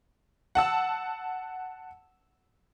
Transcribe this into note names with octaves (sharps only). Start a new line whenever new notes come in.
F#5 A5 E6